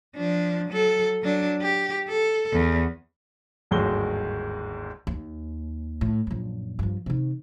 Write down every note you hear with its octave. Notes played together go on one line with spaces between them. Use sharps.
F3 D4
F#3 A4
F#3 D4
G4
A4
E2
G1 D#2 G#2 F#3 G#3 G7
D#2
A2
A#1 F#2
G2 F3
C3 D#3